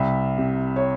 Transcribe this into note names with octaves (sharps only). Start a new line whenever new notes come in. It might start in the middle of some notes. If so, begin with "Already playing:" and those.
Already playing: C2 E5
C3
C#5